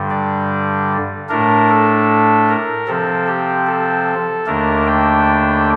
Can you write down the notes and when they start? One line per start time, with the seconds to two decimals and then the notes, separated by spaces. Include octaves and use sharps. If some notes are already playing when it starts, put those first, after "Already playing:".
Already playing: G2 D3 G3
0.10 D5
1.29 A2 A3 D4 A#4
1.69 A4
2.49 A#4
2.88 C3 F3 C4 A4
3.27 G4
3.67 A4
4.46 D#2 D3 A3 D4 A#4
4.87 G5